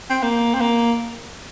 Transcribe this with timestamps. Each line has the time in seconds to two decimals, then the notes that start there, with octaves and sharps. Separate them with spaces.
0.10 C4
0.23 A#3
0.54 C4
0.61 A#3